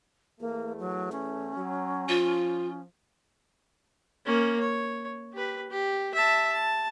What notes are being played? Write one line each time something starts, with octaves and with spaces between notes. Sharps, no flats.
E2 A3 A#3
F#3
C#4
F#3
F3 F4
A#3 C#4
C#5
G4 B4
G4
E5 A5
A5